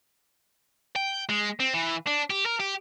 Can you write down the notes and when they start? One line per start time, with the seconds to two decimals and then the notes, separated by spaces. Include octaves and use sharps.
0.96 G5
1.29 G#3
1.60 C4
1.74 E3
2.07 D4
2.30 G4
2.46 A#4
2.60 G4